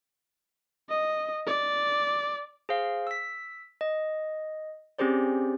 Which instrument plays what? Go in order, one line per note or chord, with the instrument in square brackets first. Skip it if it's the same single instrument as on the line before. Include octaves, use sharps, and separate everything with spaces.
[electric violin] D#5
D5
[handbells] G#4 C5 F5
E6 B6
D#5
C4 C#4 G4 G#4 C5 D5